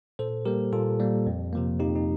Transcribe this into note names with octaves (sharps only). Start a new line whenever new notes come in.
A#2 A4 C5
G3 A#3 G4 A#4
A#2 F4 A4
G3 A#3
F2
C3 F3 A#3
F2 D#4 G4
D#4